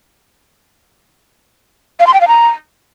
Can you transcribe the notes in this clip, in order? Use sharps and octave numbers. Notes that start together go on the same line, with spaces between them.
F5
C6
G5
F5
A#5